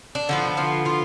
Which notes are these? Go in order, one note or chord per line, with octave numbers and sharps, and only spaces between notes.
D4
D3 F3 B3 D#4
F3 F4
F3 F4